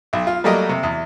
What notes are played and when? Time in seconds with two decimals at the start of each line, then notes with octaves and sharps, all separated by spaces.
0.13 B1
0.27 F4
0.44 F#3 G3 A3 A#3 G4 D#5
0.69 C3
0.83 E2